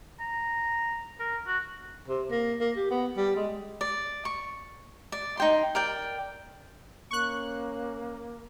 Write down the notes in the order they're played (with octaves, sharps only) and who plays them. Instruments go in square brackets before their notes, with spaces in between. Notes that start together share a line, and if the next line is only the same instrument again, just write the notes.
[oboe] A#5
A#4
F#4
[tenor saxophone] C3
A#3
A#3
G4
B3
G3
G#3
[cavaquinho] D5
C#6
D5
D#4 G5 C6
A#4 D5 G5
[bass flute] A#3 [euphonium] C#4 [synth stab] C#6 F#6